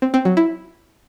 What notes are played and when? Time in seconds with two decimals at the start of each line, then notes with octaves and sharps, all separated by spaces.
0.02 C4
0.14 C4
0.25 F#3
0.37 E4